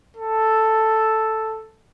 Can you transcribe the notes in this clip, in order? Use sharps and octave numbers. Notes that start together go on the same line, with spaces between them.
A4